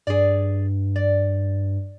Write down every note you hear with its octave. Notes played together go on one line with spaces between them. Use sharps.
G2 G#4 D5
D5